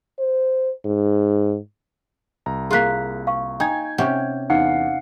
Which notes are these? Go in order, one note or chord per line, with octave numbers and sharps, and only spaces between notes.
C5
G#2
C2 A#5
A#3 F4 G#4 F#6 B6
F5 C#6
D#4 G5 G#5 G#6
C3 C#4 G4 F#5
E2 D#4 F5 F#5